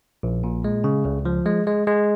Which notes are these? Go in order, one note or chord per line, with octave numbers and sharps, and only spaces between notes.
A#1
A#2
G#3
C#3
C#2
F3
G#3
G#3
G#3